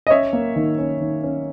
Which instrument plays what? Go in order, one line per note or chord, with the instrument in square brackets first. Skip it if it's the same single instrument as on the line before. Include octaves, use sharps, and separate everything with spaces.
[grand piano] D#5
C#4 C#5 E5
A#3
D#3
C#4
D#3
C#4